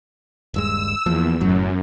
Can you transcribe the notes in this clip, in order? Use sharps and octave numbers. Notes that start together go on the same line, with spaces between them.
D#1 G2 G#3 E6
E2 F3 A#3
F#1 F#2 A2 F#3